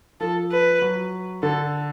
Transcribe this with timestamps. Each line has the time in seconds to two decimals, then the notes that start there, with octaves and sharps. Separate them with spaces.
0.20 F3 A4
0.51 B4
0.82 F#3
1.43 D3 A4